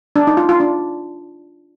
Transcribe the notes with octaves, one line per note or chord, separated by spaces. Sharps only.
D4
D#4
F4
F4
D4